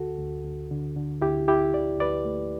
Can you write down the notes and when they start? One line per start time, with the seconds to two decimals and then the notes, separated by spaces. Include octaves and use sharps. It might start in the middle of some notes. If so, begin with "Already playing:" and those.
Already playing: D2 D3 F#4 A4
0.19 D2
0.45 D2
0.71 D3
0.96 D3
1.22 D2 E4 G4
1.47 D2 E4 G4
1.73 D2 D5
1.99 D2 B4 D5
2.25 A3